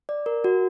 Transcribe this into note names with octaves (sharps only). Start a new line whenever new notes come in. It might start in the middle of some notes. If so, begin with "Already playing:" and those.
D5
A#4
F#4